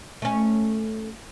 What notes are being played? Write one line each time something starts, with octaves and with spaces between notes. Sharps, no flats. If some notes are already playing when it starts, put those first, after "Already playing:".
A3 C#4